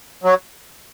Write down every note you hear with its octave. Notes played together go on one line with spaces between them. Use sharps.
F#3